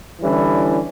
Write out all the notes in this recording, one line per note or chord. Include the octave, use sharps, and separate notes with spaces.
D3 E3 G3 C#4 E4